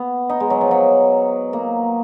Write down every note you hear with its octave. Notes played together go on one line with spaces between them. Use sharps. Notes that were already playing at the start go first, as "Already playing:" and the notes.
Already playing: B3
D#4
G#3
F#3
F3
F#3
A#3